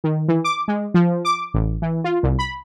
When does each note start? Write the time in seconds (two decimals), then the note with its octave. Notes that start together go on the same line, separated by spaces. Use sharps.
0.04 D#3
0.28 E3
0.44 D6
0.68 G#3
0.94 F3
1.25 D6
1.54 A1
1.82 E3
2.04 F4
2.23 C2
2.39 B5